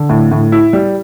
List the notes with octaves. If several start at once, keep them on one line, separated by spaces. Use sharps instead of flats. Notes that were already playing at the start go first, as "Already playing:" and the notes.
Already playing: D3
A2
A2
E4
G3